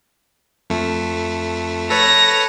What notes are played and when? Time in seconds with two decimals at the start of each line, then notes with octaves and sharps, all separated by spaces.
0.70 F2 A3
1.90 A4 B4 C#5 A#6 F7